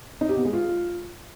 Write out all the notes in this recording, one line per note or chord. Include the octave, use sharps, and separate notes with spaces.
D#4
G4
B3
G#3
F4